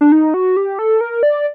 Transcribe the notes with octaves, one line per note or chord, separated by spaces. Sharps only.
D4
D#4
F#4
G4
A4
A#4
D5